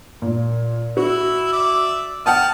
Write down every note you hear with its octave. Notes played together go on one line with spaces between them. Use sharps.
A#2
E4 F#4
D5 E5
F#5 G5 A5 D#6 F6